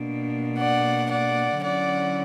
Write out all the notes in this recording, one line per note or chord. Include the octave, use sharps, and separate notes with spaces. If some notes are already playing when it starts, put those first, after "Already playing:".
Already playing: B2 A#3 D4
D5 F#5
D5 F#5
D3 F#3 C#4 E4 D5 F#5